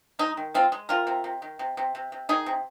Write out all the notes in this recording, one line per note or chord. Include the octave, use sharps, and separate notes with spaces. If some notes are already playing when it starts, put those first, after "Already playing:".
G#3 D#4
D#3
G#3 C4 F4
G#3
C3 F4 A#4
C3
C3
D#3
C3
C3
C3
C3
D#3 D#4 G#4
C3